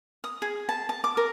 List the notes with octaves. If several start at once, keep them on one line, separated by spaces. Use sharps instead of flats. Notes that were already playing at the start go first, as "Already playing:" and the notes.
D#6
G#4
A5
A5
D6
A#4